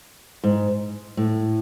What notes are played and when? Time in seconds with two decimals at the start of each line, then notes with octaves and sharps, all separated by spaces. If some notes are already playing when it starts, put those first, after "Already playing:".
0.44 G#2
1.17 A2